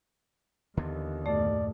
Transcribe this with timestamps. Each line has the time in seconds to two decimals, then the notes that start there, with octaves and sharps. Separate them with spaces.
0.77 D#2 D3 E3 B3
1.26 F#2 A2 A3 D5